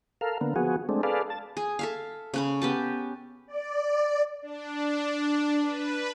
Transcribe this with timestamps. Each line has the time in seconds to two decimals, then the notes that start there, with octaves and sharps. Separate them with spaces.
0.21 A4 A#4 F5
0.41 D3 A#3 B3
0.56 F3 B3 F#4 G#4
0.89 G#3 A3 C4 D4
1.03 G#4 A4 B4 D5 F5
1.30 A5
1.57 G#4
1.79 A4 E5 F5
2.34 C#3 C#4 B5
2.62 B3 G4 A5
3.46 D5
4.42 D4
5.61 B4